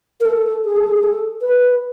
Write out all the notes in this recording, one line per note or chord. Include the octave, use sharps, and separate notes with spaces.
A#4
A4
G#4
A4
G#4
G#4
A4
B4